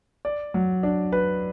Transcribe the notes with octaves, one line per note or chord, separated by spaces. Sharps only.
D5
F#3
D4
B4